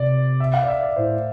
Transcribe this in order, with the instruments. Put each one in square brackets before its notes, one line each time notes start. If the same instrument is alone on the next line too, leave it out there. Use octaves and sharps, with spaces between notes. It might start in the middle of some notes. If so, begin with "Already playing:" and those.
Already playing: [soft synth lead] C3 [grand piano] D5
[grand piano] E5
F5
D5
E5
D5
[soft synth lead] A2 [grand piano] C5